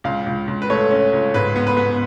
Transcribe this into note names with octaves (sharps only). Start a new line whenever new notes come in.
C#2 F5
C#2
C#2
B4
A3 C#5
C#4
C#2
G#2 B4
B3
B4
B3